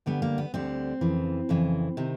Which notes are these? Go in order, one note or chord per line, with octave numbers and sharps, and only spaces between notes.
D2 D3 G3 B3
A#3
B3
D2 D3 G3 C4
F2 C#3 E3
F2 C#3 E3
C3 D#3